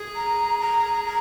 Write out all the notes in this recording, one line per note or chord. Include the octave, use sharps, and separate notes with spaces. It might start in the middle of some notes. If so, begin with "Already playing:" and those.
Already playing: G#4
A#5
A#5
A#5